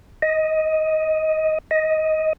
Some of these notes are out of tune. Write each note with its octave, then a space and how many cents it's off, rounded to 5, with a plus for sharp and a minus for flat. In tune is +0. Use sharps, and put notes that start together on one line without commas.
D#5 +15
D#5 +15